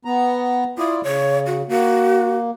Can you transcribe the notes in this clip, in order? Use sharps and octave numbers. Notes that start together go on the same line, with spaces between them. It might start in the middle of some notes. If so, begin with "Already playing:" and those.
B3 A#5
E4 F4 D5 D#6
C#3 C#5
F#4
A#3 F#4